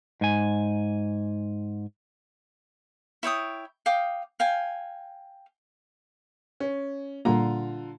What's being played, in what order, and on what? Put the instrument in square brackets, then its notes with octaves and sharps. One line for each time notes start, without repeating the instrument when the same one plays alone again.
[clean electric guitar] G#2 G#5
[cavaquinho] E4 C#5 G5 D#6
F5 G5 D6 D#6
F5 G5 G#5
[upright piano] C#4
[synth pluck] A#2 G3 A#3 [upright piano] D3 F4 A#5